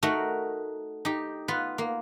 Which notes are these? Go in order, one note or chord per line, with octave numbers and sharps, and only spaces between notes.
A3 D#4 F#4 A#4
D#4 G4
B3 F4 B4
A#3